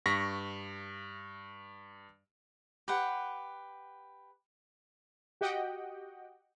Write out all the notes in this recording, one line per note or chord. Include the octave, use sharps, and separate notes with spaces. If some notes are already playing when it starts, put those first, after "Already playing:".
G2 C#6 A#6 B6
G4 B4 F#5
F#4 G4 D#5 F#5 G5